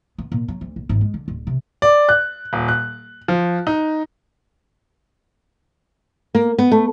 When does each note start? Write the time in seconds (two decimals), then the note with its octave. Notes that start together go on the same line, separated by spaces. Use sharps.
0.18 B3
0.32 A#2
0.48 F#3
0.61 D2
0.76 A#1
0.89 G#1
1.01 G#3
1.14 D3
1.28 D1
1.47 C3
1.82 D5
2.09 F#6
2.53 D#1
2.68 F#6
3.28 F3
3.67 D#4
6.35 A#3
6.58 B3
6.71 A3